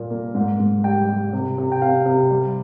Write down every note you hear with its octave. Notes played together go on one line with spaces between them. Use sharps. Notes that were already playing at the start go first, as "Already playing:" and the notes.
Already playing: A#2 G3 A#3
A#3
G#2
G#2
G3 G5
G3
C3
C3
G5
C3 F5
C3
G3